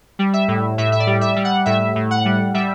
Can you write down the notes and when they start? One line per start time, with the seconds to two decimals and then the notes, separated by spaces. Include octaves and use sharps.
0.19 G3
0.33 E5
0.48 A2
0.78 A2 E5
0.92 E5
1.00 D5
1.07 G3
1.21 E5
1.36 G3
1.45 F#5
1.66 A2 E5
1.96 A2
2.11 F#5
2.25 G3
2.54 G3 E5